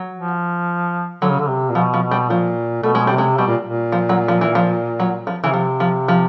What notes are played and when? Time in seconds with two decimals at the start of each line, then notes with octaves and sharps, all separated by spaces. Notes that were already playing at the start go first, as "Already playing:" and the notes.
Already playing: F#3
0.14 F3
1.22 D3 F#3
1.30 C#3
1.39 D3
1.49 C3
1.69 A#2
1.75 B2 F3
1.94 F3
2.03 B2
2.11 G3
2.30 A#2 F3
2.83 B2 A3
2.95 G#3
3.07 C3 G3
3.18 G#3
3.38 B2 G3
3.47 A#2
3.66 A#2
3.92 F3
4.09 F#3
4.28 F3
4.41 E3
4.55 F3
5.00 F#3
5.27 F3
5.44 C#3 E3
5.53 C3 F3
5.80 F3
6.08 F3